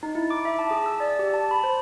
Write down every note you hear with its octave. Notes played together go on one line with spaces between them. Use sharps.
D#4
E4
D6
E5
A5
G#4
E6
D5
G4
A5
B5
C5